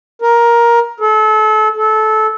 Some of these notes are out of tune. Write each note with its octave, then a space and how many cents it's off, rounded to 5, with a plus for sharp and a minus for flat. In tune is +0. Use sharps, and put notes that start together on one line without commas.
A#4 +15
A4 -30
A4 -20